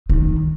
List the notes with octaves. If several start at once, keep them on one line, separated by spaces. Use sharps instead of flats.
D#3